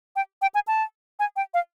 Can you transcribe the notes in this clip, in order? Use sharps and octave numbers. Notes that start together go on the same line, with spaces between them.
G5
G5
G#5
A5
G#5
G5
F5